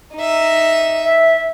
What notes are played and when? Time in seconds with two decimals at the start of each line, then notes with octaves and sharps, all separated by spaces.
0.16 D#4 E5
1.04 E5